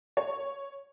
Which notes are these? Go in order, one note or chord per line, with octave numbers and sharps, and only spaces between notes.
C#5